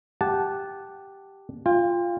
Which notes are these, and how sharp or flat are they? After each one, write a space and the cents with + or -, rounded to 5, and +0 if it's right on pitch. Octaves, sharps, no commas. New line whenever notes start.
G4 +0 F#5 +0 A5 -15
F4 +0 G5 +35